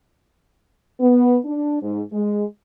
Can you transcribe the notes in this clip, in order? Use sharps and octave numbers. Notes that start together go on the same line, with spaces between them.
B3
D4
G#2
G#3